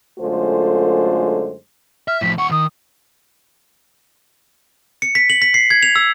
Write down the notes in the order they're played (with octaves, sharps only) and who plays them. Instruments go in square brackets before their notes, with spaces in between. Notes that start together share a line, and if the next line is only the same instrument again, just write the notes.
[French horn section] F#2 D3 G#3 A3 F4 C5
[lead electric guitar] E5 [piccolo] F6
[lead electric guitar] A2 F3 [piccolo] B6
[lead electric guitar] D#2 F#5 [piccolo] C#6
[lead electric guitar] D#3 [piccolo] D#6
[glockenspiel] C#7
B6
F#7
B6
C7
G#6
F7
E6